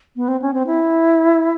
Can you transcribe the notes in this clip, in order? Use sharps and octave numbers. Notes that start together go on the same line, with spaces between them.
B3
C4
C#4
C4
E4